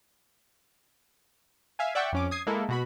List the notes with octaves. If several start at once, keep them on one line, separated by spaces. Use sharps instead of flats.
E5 F5 G#5
D5 E5 F#5 G5 C#6
F2 C#4 D6
D#6 G#6 C7
G#3 A#3 E4 A4
B2 F#4 B5